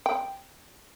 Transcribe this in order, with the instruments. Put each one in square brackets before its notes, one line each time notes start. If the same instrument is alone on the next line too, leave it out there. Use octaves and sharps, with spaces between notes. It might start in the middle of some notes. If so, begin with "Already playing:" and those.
[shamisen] G5